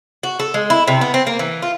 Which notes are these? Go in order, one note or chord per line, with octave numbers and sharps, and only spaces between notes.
F#4
A4
G#3
E4
C3
B3
C4
A#3
E3
F4